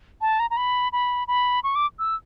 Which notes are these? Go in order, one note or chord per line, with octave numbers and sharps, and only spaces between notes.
A5
A#5
A#5
B5
B5
B5
C#6
D6
E6